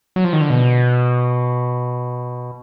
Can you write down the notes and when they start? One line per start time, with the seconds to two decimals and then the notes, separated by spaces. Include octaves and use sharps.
0.16 F#3
0.24 F3
0.33 D#3
0.41 D3
0.50 B2